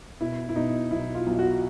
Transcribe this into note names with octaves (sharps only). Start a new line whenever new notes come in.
B2 E4
E4
B2 D#4
B1 E4
F4
B1
F#4